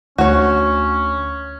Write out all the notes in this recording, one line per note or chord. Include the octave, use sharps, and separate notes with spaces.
D2 C#4 F#4 C#5